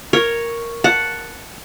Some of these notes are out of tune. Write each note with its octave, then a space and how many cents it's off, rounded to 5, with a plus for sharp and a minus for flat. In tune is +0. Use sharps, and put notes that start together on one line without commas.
A#4 +0 C#5 +0
F#5 +0 A5 +0